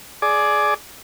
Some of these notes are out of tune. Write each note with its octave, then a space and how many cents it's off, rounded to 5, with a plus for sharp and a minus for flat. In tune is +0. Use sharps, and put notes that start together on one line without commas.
G#4 +20 D5 +0